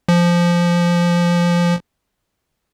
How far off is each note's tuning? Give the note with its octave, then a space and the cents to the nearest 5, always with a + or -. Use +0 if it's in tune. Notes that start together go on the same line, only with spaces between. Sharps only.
F3 -10